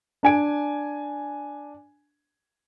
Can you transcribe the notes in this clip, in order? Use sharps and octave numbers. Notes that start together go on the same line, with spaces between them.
D4 G#5 D7